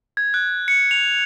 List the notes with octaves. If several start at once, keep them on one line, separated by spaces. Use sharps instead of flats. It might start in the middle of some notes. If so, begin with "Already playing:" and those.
G#6
F#6
C#7
F7